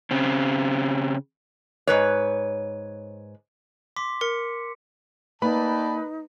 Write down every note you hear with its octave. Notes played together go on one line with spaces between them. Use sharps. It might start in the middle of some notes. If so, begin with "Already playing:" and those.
C#3 C4
G#2 B4 C#5
C6 D6 B6
A#4 C#7
A#3 D#4 B4 D5 G5 A5 B5